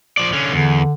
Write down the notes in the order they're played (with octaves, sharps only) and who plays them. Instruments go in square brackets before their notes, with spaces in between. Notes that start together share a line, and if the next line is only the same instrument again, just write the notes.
[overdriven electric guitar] F3 D5
D3 C#4
[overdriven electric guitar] E2 [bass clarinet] D3